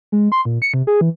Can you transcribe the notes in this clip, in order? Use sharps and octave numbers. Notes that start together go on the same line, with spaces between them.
G#3
C6
A#2
C#7
C3
G#4
E3